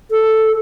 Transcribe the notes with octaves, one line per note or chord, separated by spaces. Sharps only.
A4